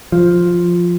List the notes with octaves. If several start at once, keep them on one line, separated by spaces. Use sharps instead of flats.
F3